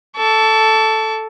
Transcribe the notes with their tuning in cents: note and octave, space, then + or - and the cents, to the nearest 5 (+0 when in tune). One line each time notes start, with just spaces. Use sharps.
A4 +0 C#6 +45